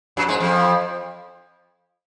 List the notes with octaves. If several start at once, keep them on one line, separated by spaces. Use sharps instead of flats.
F#2 F#3
G#2 G#3
F2 F3